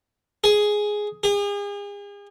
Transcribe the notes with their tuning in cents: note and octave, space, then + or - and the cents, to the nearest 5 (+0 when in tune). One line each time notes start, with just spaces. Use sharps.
G#4 +5
G#4 -40